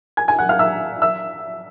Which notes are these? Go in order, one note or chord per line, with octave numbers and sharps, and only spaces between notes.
G#5 G#6
G#5 G#6
F#5 F#6
F5 F6
E5 E6
E5 E6